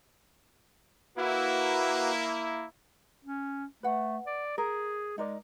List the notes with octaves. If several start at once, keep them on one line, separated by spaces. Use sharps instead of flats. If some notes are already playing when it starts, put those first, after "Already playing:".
A#3 E4 F#4 B4
C#4
A3 B4 F#5
D5
G#4 A#4
G#3 D#4 A#4 D5